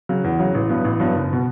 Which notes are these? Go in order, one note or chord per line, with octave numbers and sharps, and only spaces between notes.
C#3 F#3
E2
C#3 F#3
A1
G2 F#3 B3
A1
G2 F#3 B3
F#1
B2